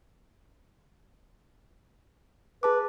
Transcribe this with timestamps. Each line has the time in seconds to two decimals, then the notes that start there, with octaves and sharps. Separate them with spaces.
2.63 G#4 B4 A5 D6